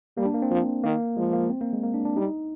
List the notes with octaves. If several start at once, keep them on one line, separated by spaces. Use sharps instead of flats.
G3 A#3
D4
A#3
C4
F3
D#3 A#3
F3 G#3
A#3
C4
A#3
G#3
A#3
D4
D4
G3 D#4